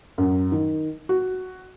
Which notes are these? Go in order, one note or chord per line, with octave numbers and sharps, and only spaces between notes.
F#2
D#3
F#4